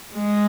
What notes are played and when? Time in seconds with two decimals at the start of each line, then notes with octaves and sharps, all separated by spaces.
0.14 G#3